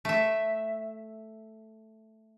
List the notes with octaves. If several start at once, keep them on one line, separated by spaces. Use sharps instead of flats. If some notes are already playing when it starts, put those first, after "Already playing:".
A3 E5